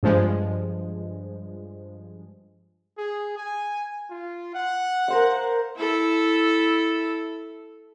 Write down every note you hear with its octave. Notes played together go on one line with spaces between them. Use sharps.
G2 F3 G#3
G#4
G#5
F4
F#5
A#4 C5 F5
E4 A4